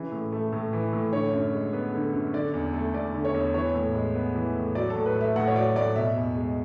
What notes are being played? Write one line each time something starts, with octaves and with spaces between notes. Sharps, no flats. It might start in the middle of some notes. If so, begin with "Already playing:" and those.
Already playing: C#3 E3
A2
A3
A2
E3
A2
D3 C#5
F#2
G#3
B3
D3
F#2
D3 D5
E2
A3
E2 D5
D3
C#5
E2
E3 C#5
A2
G#3
B3
E3
A2
F#3 D5
A4
A2
B4
A3
E5
A2 F#5
C#5
F#3 D5
A2 D5
B2 E5
E2
G#3